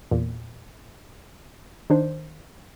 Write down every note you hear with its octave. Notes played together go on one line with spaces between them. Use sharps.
E2 A#2
D#3 D4 C5